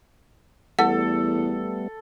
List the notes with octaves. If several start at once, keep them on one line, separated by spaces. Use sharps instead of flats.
E2 G3 A3 B3 A4 F#5